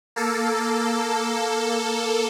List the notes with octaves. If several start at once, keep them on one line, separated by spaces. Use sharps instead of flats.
A#3 A4